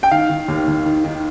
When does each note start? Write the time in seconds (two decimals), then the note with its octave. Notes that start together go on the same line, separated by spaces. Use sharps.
0.03 G5
0.11 D#3 F5
0.29 D#3
0.48 D#2
0.67 D#2
0.85 D#3
1.04 D#3